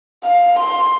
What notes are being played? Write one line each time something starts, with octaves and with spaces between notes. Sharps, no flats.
F5
C6